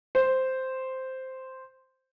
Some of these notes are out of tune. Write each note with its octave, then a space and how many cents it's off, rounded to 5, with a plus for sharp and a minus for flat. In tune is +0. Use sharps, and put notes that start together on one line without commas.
C5 -5